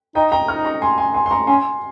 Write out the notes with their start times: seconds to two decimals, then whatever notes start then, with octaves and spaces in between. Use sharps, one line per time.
0.15 D#4 D#5 G5
0.32 G5 A#5
0.48 D#4 C#6 F6
0.65 A#5 C#6
0.82 G#5 C6
0.98 G#5 C6
1.14 G#5 C6
1.26 C6
1.31 A#5 C#6
1.47 C#4 G#5 C6